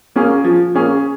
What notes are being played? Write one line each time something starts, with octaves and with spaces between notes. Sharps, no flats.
A#3 C#4 G#4
F3
A#3 C#4 G#4